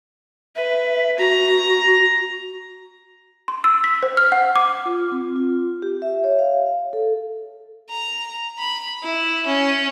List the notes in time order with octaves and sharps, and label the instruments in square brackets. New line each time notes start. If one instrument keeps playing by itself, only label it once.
[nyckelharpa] B4 [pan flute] E5
[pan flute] F#4 [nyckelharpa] A#5
[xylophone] C6
E6
B6
C5
F6
F#5
D6
[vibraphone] F4
C4
F4
G4
E5
C#5
F5
A4
[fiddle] A#5
B5
E4
C#4